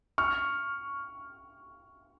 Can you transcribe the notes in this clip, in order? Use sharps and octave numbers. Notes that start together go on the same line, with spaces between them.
C#6 F6